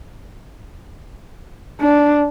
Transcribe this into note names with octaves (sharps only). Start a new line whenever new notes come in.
D4